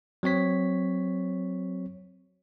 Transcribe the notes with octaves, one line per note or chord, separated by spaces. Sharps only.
F#3 C4 C#5 B6